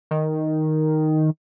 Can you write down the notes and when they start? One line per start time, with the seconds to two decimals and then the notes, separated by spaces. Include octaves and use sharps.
0.11 D#3